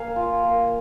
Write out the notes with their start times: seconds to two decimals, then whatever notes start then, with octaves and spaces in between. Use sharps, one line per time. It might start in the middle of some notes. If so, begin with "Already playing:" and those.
Already playing: A#3 F5 G#5
0.16 F4
0.43 A#3